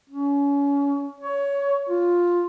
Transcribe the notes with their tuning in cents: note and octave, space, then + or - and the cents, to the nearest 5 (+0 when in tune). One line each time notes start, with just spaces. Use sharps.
C#4 +30
C#5 +20
F4 +5